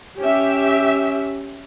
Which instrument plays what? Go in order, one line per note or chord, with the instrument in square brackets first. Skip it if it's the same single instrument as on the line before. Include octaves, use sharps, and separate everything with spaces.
[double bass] C#4 [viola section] G4 E5